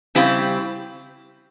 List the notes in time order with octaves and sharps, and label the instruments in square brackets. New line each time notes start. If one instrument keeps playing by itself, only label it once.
[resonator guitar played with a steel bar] C#3 G3 C4 E4 G4